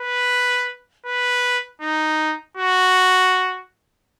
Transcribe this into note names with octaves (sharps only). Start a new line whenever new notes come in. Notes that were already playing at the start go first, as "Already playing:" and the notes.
Already playing: B4
B4
D#4
F#4